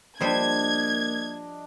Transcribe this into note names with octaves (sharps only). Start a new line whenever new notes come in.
F3 G3 A#3 D4 C5 D#5 G#6